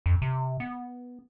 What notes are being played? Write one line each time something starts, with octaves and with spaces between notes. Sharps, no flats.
F2
C3
B3